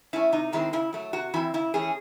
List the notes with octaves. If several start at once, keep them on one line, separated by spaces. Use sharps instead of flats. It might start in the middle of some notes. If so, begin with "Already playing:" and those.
A3 C#4 E4
C3 D#4
D#3 G#3 C4 E4
C#3 E4
F#3 A3
C3 F#4
E3 C4 E4
C#3 E4
E3 A3 C#4 G#4